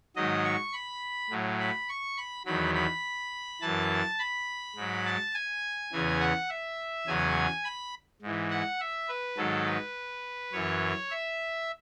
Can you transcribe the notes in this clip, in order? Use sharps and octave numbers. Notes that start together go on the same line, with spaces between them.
G#2 D#3 F#3 D#5
C#6
B5
A2 F#3
B5
C#6
B5
E2 D#3 F#3 B5
B5
F#2 E3 A5
B5
G#2 F#3
A5
G#5
E2 C#3 E3
F#5
E5
E2 C#3 F#3 G#5
B5
G#2 E3
F#5
E5
B4
G#2 D#3 F#3 A4
B4
F#2 E3 C#5
E5